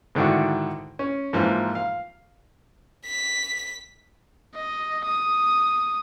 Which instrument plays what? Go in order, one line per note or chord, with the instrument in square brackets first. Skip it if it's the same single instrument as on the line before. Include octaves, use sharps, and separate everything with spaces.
[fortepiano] G#2 D3 D#3 D4 E4 F#4
C#4
G#2 E3 F3 A#3
F5
[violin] B6
[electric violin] D#5
D#6